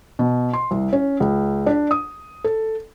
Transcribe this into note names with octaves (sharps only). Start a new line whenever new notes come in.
B2
C6
C2
C#4
C#2
D4
D#6
A4